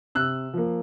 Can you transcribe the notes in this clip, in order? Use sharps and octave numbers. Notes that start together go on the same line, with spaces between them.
C3 E6 F#6
F3 A#3